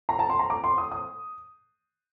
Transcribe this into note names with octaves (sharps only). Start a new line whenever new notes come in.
A#5
A5
C6
A#5
D6
C6
D#6
D#6